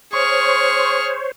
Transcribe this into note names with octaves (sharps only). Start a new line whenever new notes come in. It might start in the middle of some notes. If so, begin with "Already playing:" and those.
G#4 C5 C#5 C#6 F6